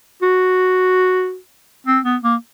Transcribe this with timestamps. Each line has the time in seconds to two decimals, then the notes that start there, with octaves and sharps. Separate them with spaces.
0.22 F#4
1.87 C4
2.04 B3
2.23 A#3